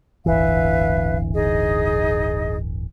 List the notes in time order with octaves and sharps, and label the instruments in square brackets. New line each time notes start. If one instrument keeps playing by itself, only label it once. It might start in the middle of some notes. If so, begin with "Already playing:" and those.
[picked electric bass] D1 G1 E3 [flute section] B4 E5 F5
[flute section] D#4 G#4 D#5